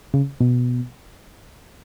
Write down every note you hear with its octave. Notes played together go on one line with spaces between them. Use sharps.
C#3
B2